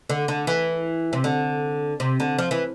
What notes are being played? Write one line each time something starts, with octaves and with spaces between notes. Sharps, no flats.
D3
D3
E3
C3
D3
C3
D3
F3
E3